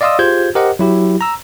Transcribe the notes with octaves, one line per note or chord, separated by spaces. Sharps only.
D5 D#5 F5 C6 D#6 E6
F4 G4 G#4 C5 G6 G#6
G4 A#4 C5 D#5 F#5
F#3 E4 G4
A#5 E6